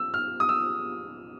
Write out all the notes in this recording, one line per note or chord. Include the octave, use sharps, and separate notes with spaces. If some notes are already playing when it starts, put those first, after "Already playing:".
Already playing: E6
F6
D#6
E6